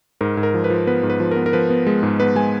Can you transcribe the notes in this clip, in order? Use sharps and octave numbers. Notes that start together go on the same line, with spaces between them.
G#2 A#4
G#2
A#4
F3
B4
F3
B3 B4
G#2
B4
F3
B3 A#4
A#4
F3 B4
B3
G#3
G#2
B3 B4
G#3 G#5